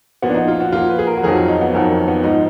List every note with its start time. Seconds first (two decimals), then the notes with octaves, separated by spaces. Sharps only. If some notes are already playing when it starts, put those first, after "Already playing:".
0.22 A#2 F3 B3
0.29 D4
0.35 D#4
0.48 F4
0.60 F#4
0.72 A#2 F3 F4
0.89 B4
0.99 G#4
1.07 A#4
1.18 F#4
1.23 F2 D#3 F#3 G#4
1.36 F4
1.48 D#4
1.61 B3
1.74 F2 D#3 F#3 A#3
1.91 A#3
2.08 B3
2.23 G#2 F3 D#4